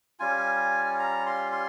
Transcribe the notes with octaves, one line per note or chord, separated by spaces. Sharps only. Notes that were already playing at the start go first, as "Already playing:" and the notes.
G3 C#4 F4 G#5
A#5
C6
C6